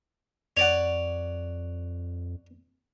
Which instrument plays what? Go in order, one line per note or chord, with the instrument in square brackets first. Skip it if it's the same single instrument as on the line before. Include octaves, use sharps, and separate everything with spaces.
[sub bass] F2 [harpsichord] C#5 D5 F#5